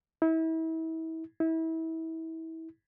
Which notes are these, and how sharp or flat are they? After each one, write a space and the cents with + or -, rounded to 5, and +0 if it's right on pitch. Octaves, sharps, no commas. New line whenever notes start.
E4 -35
E4 -30